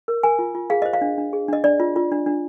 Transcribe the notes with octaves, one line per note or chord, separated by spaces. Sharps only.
A#4
A#4 G#5
F4
F4
G#4 F5
C5 D#5
F5
D4
D4
G#4
D4 D#5
D4 D5
F4
F4
D4
D4